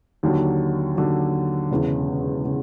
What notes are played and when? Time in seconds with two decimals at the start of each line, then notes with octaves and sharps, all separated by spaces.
0.23 D#2 D3 F#3
0.96 D#2 D3 F#3
1.71 E1 E2 C#3
2.45 C#3